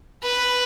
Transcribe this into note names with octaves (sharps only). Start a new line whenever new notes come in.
B4